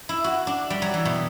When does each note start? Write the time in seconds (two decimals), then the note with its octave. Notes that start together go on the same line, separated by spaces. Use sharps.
0.09 E4
0.24 F#4
0.47 D4
0.70 G3
0.82 F#3
0.94 E3
1.05 B2